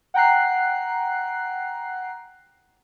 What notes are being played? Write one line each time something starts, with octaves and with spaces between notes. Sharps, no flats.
F#5 G5 A#5 F#6 C7